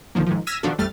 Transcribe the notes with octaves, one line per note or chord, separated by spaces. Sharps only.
B1 D3 D#3 F3 A#3
G#2 D#3 F3
E6 F6 G#6 A#6 B6 D#7
B2 D#3 F3 D4 F#4 A4
A1 F2 G3 A3 F6 A6